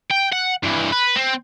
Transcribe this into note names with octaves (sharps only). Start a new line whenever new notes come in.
G5
F#5
G2 E3
B4
C4